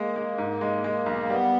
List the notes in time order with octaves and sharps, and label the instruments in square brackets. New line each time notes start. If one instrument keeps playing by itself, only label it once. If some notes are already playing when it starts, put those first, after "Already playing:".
Already playing: [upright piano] G#3 [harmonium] A#3
[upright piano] G#3
G#2
G#3
G#3
B1
[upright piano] G3 [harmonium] B3